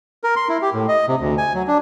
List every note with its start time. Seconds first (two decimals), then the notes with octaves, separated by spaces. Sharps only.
0.24 A#4
0.36 C6
0.49 E4
0.62 G4
0.73 A2
0.88 D#5
1.08 C3
1.20 D2
1.38 G#5
1.54 F#3
1.67 D4